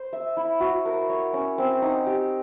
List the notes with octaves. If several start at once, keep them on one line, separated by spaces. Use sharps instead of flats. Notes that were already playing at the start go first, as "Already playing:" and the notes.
Already playing: C5
E5
E4
F#4
A#4
C#5
C#4
C4
D#4
G4